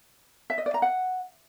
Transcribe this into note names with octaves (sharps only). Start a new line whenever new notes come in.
E5
D#5
D5
A#5
F#5